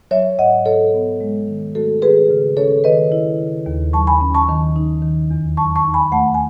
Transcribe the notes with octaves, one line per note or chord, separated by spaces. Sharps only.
F#3 C#5 E5
G#2 D#5 F#5
B2 A4 C#5
B3
G#3
D#3
A3 F#4 A4
D#3 G#4 B4
C#3
C#4 A4 C#5
D#3 B4 D#5
E4
C#3
D#2
F#3 A5 C#6
G#5 B5
C#4
A5 C#6
D#3
D#4
D#3
E2
F#3 A5 C#6
A5 C#6
D#4
G#5 B5
A3 F#5 A5
G#5